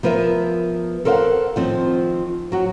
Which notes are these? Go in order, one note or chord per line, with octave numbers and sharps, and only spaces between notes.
F3 B3 A#4 B4 E5
A4 A#4 C5 D5 F5 F#5
D#3 F3 C4
F#3 F#4